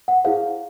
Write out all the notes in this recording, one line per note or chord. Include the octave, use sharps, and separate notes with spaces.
F#5
E4 G#4 C5 F5